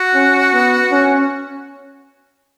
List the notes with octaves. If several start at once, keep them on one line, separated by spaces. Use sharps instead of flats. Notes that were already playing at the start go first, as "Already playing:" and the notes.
Already playing: F#4
C#4
B3
C#4